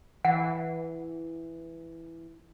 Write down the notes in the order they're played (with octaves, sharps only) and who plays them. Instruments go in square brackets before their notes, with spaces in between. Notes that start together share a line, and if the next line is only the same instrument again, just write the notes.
[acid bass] E3 [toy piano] F#5